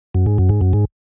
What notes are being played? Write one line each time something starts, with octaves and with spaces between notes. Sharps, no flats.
F#2
G#2
F#2
G#2
F#2
G#2